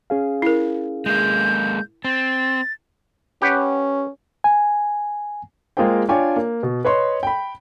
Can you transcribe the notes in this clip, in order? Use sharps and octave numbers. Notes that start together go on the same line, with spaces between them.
C#4 G#4 F5
E4 A#4
G#3 A#3 G6
C4 A6
C#4 G4 B4 F#5
G#5
G#3 A#3 F4 G#4 C5 G5
D4 F4 C#5 G5 G#5 D6
A#3
B2
B4 C#5 D#5 C6
G5 B5